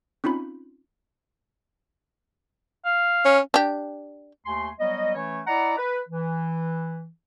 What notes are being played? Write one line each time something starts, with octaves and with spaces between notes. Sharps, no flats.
C4 C#4 D#4 F4 B5
F5
C#4
D4 G4
D#2 A3 G#5 C6
F#3 G3 B3 D#5
E3 A3 C#4 C#5
E4 D5 D#5 F#5 A#5
B4
E3